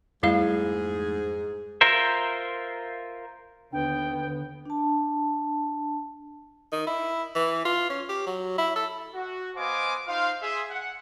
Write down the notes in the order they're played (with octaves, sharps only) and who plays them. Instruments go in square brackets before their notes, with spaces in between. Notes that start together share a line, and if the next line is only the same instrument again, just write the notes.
[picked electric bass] F2 A3 [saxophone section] G#2 G#4 [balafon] G3 E4 F5
[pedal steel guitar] F4 A#4 C5 E5
[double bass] D#2 B3 [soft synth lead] D3 [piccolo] G5
[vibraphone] D4 A5
[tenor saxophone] D#3
E4
E3
F4
C#4
G4
F#3
E4
A4
[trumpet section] F#4
B3 C5 D#5 F5 G#5 D6
D#4 F4 C5 F5
G#4 E5 C6
F#5